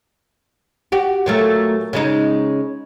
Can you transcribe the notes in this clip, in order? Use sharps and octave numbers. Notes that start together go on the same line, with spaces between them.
F#4 G4
A#2 F#3 A3
C#3 G#3 D#4